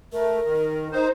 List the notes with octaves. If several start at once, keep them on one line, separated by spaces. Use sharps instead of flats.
A3 A#4
D#3
D#4 C5